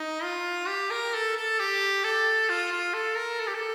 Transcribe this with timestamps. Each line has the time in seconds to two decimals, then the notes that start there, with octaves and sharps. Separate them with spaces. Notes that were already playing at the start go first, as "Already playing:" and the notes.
Already playing: D#4
0.24 F4
0.68 G4
0.91 A#4
1.14 A4
1.37 A4
1.59 G4
2.04 A4
2.49 F4
2.72 F4
2.94 A4
3.17 A#4
3.40 A4
3.47 G4
3.54 A4